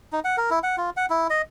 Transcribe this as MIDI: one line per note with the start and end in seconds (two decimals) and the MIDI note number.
0.12 0.20 63
0.25 0.36 78
0.37 0.50 70
0.50 0.59 64
0.63 0.76 78
0.78 0.90 65
0.97 1.06 78
1.10 1.27 64
1.30 1.42 75